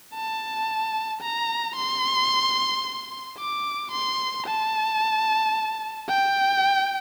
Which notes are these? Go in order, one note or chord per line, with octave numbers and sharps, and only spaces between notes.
A5
A#5
C6
D6
C6
A5
G5